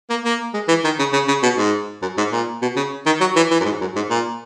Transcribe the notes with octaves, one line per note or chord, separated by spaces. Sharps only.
A#3
A#3
G#3
E3
D#3
C#3
C#3
C#3
B2
G#2
F#2
G#2
A#2
B2
C#3
D#3
F#3
E3
E3
F#2
G#2
F#2
G#2
A#2